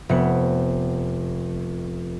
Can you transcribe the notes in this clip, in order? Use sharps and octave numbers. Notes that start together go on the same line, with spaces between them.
F1 B3 C#7